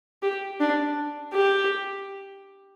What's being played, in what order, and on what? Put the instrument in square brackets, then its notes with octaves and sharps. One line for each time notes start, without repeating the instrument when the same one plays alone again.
[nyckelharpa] G4
D4
G4